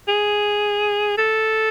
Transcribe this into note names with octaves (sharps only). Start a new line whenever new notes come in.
G#4
A4